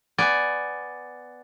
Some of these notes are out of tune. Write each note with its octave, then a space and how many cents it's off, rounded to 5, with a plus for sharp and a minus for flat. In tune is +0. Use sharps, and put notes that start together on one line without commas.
B3 +10 D5 +0 G#5 +0